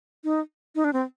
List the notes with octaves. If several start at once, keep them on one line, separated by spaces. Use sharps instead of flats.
D#4
D#4
D4
C4